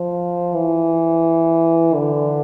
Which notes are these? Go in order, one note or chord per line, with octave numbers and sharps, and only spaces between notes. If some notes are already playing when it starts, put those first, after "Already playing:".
Already playing: F3
E3
D3